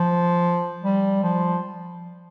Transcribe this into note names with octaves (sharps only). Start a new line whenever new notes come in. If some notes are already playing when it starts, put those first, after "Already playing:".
Already playing: F3
G3
F3